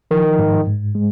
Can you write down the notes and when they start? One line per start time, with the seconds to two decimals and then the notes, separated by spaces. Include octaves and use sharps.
0.11 D#3 F3
0.39 G#2
0.67 G#2
0.95 G#3